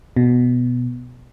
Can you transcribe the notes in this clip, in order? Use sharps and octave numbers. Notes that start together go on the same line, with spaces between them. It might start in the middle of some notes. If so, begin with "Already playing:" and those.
B2